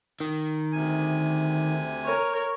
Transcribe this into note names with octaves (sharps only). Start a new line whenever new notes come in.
D#3
D2 C3 G#5
A#4 C#5